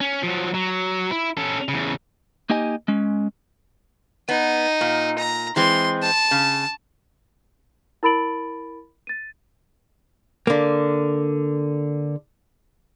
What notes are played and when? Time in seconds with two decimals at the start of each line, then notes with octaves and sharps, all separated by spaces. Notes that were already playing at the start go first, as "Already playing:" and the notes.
0.01 C#4
0.23 F3 F#3
0.54 F#3
1.11 E4
1.37 C#4 A4
1.68 E2 C#3
2.50 A#3 D#4 G4 D#5 G#5
2.88 G#3 C#4
4.29 B3 D#4
4.81 A#2
5.19 A#5
5.56 E3 G#3 C4 C6
6.02 A5
6.31 C#3
8.03 E4 A#4 B5 A6 D7 F#7
9.07 A6 D#7
10.47 D3 A#3